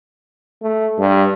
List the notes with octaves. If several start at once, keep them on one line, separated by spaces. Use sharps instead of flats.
A3
G2